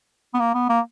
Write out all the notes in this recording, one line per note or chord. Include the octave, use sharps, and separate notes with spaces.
B3
A#3
B3
A#3